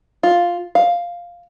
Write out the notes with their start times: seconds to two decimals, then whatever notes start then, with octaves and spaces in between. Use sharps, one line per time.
0.23 F4
0.75 F5